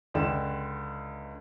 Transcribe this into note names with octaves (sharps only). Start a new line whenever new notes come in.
C#2 D3 D5 G5 E7